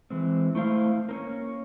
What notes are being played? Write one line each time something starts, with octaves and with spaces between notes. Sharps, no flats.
E3 G#3 C4
A3 E4 C5 F5
A#3 C4 C#4